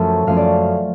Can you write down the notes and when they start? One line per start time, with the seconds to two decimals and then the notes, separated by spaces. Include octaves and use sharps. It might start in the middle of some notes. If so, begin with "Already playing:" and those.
Already playing: F#2 F3 A3 C#4 A4
0.27 F#2 F3 A3 C#4 F5
0.37 D5